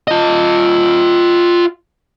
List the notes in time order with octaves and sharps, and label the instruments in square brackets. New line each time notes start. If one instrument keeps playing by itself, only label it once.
[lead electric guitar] F4 D#5